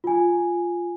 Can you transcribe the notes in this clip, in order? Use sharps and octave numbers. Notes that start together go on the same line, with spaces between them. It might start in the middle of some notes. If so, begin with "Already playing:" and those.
F4 G#5